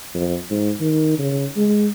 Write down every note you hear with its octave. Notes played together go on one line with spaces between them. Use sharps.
F2
G#2
D#3
C#3
G#3